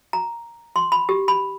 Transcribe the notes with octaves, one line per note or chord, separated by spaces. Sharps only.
A#5
C6
B5
G4
B5